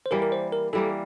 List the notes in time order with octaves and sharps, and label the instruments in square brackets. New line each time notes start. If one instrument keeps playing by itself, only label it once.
[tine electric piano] C5
[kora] E3 G3 A#3 [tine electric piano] A#4
[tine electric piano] A#4
C5
A#4
[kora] E3 G3 A#3 [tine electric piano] A4